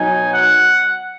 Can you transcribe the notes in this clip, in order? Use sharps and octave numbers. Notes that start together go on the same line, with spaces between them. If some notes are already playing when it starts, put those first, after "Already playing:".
Already playing: B2 F#3 D#4 G#5
F#5